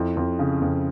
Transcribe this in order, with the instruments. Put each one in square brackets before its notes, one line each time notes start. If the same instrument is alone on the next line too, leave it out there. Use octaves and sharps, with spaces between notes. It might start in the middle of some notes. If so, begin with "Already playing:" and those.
Already playing: [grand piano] F2 E4
F2
C#3
F2